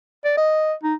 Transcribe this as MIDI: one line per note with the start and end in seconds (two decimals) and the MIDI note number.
0.24 0.36 74
0.37 0.73 75
0.83 0.94 63